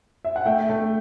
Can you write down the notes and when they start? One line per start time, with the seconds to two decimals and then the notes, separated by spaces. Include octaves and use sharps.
0.25 E5
0.36 F#5
0.45 A3 E5 G5
0.69 A3